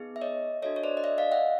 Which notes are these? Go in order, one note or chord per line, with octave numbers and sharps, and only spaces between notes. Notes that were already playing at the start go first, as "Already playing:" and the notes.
Already playing: B3 D#4 G#4
E5
C#5 D#5
D4 F#4 A4 C#5 D#5
C#5
C5 D5
D#5
D5 E5
D#5 F5
E5 F#5